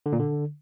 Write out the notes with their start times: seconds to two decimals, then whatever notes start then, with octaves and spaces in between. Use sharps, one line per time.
0.06 D3
0.13 A#2
0.19 D3